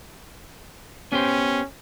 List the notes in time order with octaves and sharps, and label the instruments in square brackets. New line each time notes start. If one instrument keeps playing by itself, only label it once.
[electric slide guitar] B3 G4 C5 [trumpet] C#4